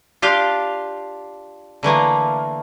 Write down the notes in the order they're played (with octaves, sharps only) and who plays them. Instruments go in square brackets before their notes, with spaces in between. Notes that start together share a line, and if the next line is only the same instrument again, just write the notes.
[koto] D4 F4 G4 F5
D3 E3 A3 A#3